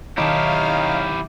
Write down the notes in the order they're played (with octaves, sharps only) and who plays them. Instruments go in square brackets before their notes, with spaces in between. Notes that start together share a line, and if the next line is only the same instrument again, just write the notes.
[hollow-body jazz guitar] B1 D#3 A5 [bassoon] D#4 [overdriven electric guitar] E4 G4 [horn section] C#5 F5